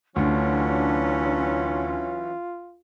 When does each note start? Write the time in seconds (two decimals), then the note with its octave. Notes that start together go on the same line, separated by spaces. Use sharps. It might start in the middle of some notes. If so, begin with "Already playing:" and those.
0.16 D2 E3 F#3 C#4 D4 F4